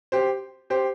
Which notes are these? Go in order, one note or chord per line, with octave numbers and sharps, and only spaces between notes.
G4 C5
G4 C5